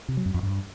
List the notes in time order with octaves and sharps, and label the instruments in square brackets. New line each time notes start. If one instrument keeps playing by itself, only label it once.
[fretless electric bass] C3
F#3
F#2
F2
G2